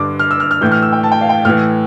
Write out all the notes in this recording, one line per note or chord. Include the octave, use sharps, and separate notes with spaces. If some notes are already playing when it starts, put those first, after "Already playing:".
Already playing: G2 D3 D6
F6
E6
F6
F6
A2 E3 G6
F6
E6
G5
A5
G5
F5
G5
A2 E3 F6